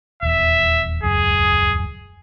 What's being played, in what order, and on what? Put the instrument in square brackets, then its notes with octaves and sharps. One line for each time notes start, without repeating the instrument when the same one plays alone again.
[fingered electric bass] D#1 E2 [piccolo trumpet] E5
[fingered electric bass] D#1 C#2 F#2 [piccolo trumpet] G#4